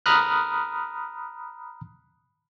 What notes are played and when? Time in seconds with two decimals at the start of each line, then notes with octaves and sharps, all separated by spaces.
0.06 A#5 B5 D#6 F6 F#6